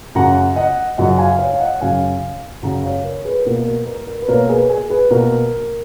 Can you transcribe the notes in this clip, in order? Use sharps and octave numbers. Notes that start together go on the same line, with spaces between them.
F#2 C#3 F#3 F#5 A#5
D#5 F#5
F#2 C#3 F#3 D#5 F#5
F5 G#5
C#5 F5
F5
D#5 F#5
F#2 C#3 F#3 F5 G#5
F#2 C#3 F#3 F#5 A#5
C#5 F5
A#4 C#5
G#4 B4
B2 A#3 A#4
A#4
A#4
A#4
B4
B2 A#3 A#4 C#5
G#4 B4
G#4
G#4 B4
B2 A#3 A#4